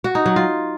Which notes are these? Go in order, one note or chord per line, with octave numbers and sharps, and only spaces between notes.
F#4
D#4
F#3
F4